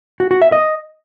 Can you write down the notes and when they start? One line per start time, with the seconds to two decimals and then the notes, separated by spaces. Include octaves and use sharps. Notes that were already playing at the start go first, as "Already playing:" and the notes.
0.20 F#4
0.31 F#4
0.42 E5
0.52 D#5